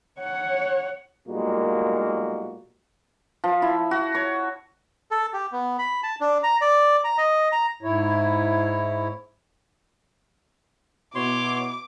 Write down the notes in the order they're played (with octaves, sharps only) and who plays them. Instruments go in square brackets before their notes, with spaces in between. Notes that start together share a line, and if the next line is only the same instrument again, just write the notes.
[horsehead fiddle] C#5 F#5
[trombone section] B1 A#2 G3 G#3 A#3 F#4
[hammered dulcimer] F3
E4
F#4
C#5
[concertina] A4
G4
B3
B5
A5
D4
A#5
D5
A#5
D#5
A#5
[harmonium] G#2 E4 C#5
[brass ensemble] B2 B3 E4 [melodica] C#5 C6 [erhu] D6